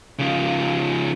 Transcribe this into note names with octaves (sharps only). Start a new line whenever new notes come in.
C#3 F3